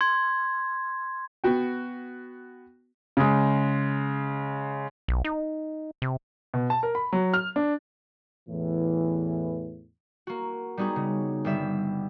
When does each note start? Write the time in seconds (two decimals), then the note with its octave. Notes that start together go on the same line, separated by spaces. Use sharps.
0.01 C6 G#6
1.44 B3 F#4 G5
3.17 C#3 G#3
5.08 B1
5.25 D#4
6.02 C3
6.54 B2
6.70 A5
6.83 A#4
6.95 B5
7.13 F#3
7.34 F6
7.56 D4
8.48 E2 A2 E3
10.27 A#3 F#4
10.77 G3 B3 D#4 F#4 G#4
10.96 C#3
11.45 G1 G3 E5